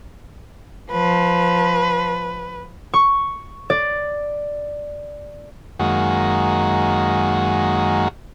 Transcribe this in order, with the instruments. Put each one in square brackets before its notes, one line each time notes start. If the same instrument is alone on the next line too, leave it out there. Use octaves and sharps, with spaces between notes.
[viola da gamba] F3 [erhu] B4
[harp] C#6
D5
[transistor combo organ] F#2 D#3 G#3 A#3 F#4